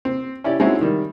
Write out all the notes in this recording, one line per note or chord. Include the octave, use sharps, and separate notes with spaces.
C4
C#4 E4 G4 D5
G#3 C4 C#4 D#4 E4 F#4
D#3 G3